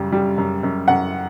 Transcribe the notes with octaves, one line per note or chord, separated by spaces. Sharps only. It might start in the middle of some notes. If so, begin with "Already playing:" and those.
Already playing: F#2 C#3 G3
G3
F#2
F#2
F#2 F#5